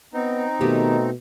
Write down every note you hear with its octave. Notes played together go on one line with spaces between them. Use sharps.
B3 C4 D#4
B2 D#3 A3 B3 G4